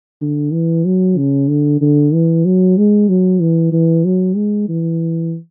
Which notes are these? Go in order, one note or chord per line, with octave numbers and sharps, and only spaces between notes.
D3
E3
F#3
C#3
D3
D3
E3
F#3
G#3
F#3
E3
E3
F#3
G#3
E3